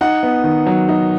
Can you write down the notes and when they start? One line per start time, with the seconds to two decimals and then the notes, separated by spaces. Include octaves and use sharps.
0.01 D#4 F#5
0.23 B3
0.44 D#3
0.66 F#3
0.89 D#4